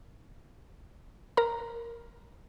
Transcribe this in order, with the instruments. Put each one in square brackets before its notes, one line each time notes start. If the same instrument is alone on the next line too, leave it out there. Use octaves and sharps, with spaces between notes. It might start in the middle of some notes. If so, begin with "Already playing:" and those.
[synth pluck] A#4 A#5